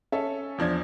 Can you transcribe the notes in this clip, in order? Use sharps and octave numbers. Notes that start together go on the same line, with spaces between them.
C#4 A4 E5
E2 F3 D4 G#6